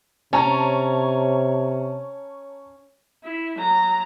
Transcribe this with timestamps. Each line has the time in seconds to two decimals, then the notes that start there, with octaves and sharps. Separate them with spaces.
0.33 C3 C#4 C#5 A5 A#5
3.24 E4
3.59 F#3 A#5